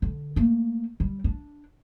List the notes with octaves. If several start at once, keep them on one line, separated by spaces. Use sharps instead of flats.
D3
A3 A#3
G3
D4